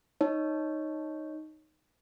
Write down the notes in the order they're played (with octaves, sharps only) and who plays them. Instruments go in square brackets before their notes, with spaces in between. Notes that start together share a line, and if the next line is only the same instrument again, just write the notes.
[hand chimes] D#4 C#5